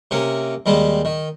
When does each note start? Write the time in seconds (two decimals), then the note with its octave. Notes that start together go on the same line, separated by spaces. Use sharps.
0.11 C3 A#3 C#4
0.66 D#2 G3 G#3 A5
1.05 D#3